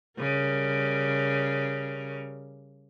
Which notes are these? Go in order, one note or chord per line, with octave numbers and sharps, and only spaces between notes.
C#3 G3 A#4